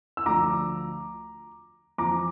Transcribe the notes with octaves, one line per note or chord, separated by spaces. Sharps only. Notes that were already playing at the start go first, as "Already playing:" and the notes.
E6
D2 D3 F3 A#5 D6
F2 E3 A#5 D6